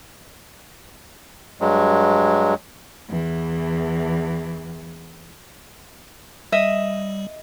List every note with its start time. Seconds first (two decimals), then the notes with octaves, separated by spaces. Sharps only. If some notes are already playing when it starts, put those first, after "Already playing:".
1.60 G2 F#3 G#3
3.10 E2 E3
6.52 G3 D#5 E5